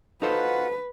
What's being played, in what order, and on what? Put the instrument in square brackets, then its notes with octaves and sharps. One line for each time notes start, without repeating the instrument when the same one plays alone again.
[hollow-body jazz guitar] D#4 A4 C5 [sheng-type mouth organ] F4 F#4 F#5 [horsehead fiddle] B4